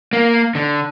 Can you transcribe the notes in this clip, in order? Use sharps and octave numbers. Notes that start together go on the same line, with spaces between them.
A#3
D3